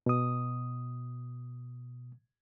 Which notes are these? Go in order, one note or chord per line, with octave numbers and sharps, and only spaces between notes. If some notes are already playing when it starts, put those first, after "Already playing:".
B2 D#6